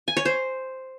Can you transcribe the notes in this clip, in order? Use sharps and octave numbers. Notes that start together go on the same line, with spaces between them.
G#5
C#5
C5